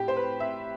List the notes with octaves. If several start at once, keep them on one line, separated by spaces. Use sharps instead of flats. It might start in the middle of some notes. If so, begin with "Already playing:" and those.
Already playing: A2 G4
C5
B4
E5